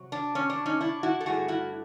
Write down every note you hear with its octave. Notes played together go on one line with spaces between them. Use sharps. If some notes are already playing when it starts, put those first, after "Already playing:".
Already playing: C3 F#3
D4
C#4
D4
C#4 D#4
D4 E4
E4 F#4
A4
G2 D3 F#3 A3 F#4 G#4
E4 F#4